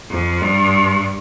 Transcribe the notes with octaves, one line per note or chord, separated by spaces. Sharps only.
F2
G2